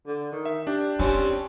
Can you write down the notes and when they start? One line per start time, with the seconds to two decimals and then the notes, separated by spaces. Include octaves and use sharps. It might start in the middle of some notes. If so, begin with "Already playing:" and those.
0.06 D3
0.32 D#3
0.45 E5
0.67 D4 G4
0.99 G3 C4 C#4 F4